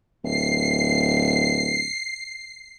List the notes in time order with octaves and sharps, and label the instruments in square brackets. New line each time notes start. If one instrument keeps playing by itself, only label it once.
[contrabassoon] D1 [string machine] C7